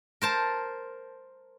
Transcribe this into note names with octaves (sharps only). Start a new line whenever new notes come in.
A#4 C5 A5